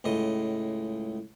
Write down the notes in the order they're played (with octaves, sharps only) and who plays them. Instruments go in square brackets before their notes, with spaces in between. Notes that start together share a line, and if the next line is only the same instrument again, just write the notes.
[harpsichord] C#2 A2 D#5 C6